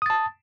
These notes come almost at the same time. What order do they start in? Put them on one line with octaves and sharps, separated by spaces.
D#6 A6 A5